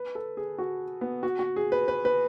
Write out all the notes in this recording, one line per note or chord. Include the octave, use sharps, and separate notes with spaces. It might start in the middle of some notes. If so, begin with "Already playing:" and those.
Already playing: B4
A4
G#4
F#4
B3
F#4
F#4
G#4
B4
B4
B4